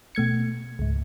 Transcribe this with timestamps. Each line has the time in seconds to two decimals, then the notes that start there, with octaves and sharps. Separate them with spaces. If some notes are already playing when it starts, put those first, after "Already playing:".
0.15 B2 A3 G#6 C#7
0.79 C#2 G#2